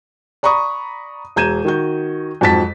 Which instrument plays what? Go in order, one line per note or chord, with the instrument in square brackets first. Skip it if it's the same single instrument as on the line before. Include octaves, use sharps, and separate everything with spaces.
[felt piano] D5 A#5 B5 C#6 D#6
E1 A#5 G6 G#6 D#7 E7
D#3 F#4 G6
F2 G#2 F#3 A5 A6 B6